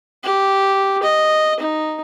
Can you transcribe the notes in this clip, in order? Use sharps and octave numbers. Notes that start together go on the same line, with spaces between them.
G4
D#5
D#4